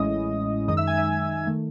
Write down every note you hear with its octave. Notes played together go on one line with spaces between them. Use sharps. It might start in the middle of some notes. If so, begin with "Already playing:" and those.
Already playing: A1 A2 G#3 C#4 E4 D#5 D#6
F#2 D#3 G#3 D#4 D#5 D#6
E5 E6
G#5 G#6
E5 E6
D#3 A3